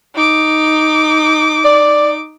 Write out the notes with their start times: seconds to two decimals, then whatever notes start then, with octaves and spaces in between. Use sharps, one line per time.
0.15 D#4 D6
1.65 D5